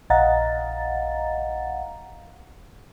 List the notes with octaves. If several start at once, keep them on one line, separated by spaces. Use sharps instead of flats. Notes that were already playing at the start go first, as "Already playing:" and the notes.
A#1 D#5 F5 F#5 A#5 A6